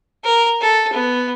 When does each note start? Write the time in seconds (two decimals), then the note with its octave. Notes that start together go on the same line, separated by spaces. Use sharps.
0.24 A#4
0.61 A4
0.93 B3